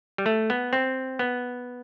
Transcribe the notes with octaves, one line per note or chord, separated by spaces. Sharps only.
G3
A3
B3
C4
B3